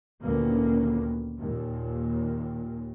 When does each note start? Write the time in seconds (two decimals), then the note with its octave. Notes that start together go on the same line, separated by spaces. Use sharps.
0.23 D2 A#2 D#3 A#3 B3 C#4
1.40 D#2 A#2